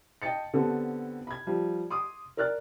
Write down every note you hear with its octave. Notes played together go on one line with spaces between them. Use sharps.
D#5 G5 A5 A6 C#7
D3 B3 C4 G4 A4
B5 G#6
F3 G3
C6 D6 D#6
A#4 D5 F6 F#6 A6